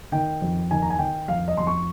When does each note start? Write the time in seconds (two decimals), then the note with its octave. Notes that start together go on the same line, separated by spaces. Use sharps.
0.12 D#3 G5
0.42 F2
0.71 D#3 G#5
0.82 A#5
0.90 G#5
0.99 D#3 G5
1.28 F2 F5
1.48 D#5
1.57 F2 C6
1.67 C#6